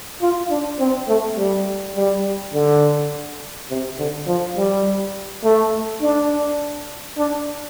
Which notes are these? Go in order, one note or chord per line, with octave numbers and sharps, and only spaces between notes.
F4
D4
C4
A3
G3
G3
D3
C3
D3
F3
G3
A3
D4
D4